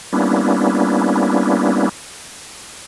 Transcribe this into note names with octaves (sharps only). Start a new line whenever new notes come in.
G3 A#3 B3 C#4 D4 E4